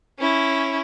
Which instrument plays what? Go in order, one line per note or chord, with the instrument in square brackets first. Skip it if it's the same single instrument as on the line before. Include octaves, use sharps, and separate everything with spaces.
[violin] C#4 E4